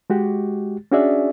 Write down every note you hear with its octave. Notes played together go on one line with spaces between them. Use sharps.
G#3 F#4 G4
C#4 D4 F#4 G#4 D5 E5